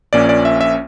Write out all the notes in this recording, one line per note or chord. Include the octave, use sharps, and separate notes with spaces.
A#1 A#2 A#3 C#4 D5
D5
E5
E5